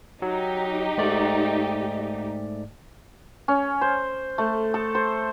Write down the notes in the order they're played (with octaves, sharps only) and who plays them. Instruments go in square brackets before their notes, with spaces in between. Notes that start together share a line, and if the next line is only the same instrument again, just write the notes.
[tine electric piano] F#3 [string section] D#4 G4
[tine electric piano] G#2 A3 D5
[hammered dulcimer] C#4
C5
A3
A4
C5